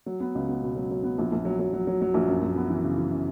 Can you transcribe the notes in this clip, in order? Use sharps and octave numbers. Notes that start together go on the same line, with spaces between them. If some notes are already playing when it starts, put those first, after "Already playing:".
F#3
B3
C#2
B3
B2
F#3
F#3
B3
A#1
A#1
F#3
F#3
F#3
F#3
F#3
A#1
F#2
F#2
B3
E3
C#3
E3
C#3